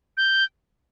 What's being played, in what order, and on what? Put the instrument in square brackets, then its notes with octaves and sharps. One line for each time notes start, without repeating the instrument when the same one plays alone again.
[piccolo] G6